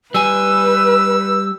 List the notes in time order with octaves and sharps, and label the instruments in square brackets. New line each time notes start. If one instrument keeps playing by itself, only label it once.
[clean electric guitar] G3 G#5 [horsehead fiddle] B4 [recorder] E6